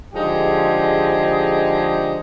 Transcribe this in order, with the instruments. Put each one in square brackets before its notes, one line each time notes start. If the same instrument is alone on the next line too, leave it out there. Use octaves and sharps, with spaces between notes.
[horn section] D3 F3 G#3 D#4 G4 G#4